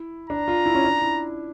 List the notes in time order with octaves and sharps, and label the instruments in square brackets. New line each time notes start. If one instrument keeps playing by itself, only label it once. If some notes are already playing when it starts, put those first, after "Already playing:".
Already playing: [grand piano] E4
[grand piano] D4 [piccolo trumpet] A#5
[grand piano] F4
E4
C#4
D4
E4